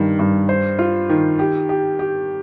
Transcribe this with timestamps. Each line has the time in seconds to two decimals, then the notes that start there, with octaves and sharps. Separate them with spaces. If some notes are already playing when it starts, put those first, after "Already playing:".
Already playing: G2 D#3
0.19 G2
0.49 C5
0.79 F4
1.09 D#3
1.39 G4
1.69 G4
1.99 G4